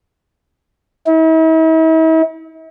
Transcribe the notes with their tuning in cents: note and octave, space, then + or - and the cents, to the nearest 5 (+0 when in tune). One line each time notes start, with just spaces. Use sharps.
E4 -45